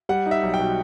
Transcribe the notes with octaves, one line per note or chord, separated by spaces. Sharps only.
G3 F#5
D#4
E5
B1
G5
B2